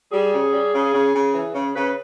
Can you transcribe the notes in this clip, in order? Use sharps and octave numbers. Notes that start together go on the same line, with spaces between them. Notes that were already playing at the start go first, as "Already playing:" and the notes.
G3 G#4
C#3
G3
C#3
C#3
C#3
E3
C#3
C#3 B4